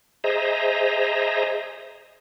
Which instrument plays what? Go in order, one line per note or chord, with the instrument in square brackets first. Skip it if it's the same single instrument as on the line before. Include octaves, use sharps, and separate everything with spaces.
[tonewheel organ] G#4 C5 D#5 E5 A#5